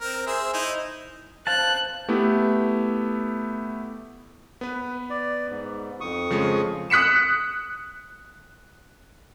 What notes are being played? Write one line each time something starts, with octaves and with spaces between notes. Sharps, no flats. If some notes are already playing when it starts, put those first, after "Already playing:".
C4 A#4
G#4 C5 E5
D#4 E4 C5
C5 F5 A5 F#6
A3 B3 E4 G4
B3 B4
D5
G#2
F2 C#6 D#6
C#3 F3 G#3
D#6 F#6 B6 C#7 E7